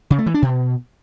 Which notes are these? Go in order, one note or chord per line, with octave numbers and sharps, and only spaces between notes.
C#3
A3
E3
D4
B2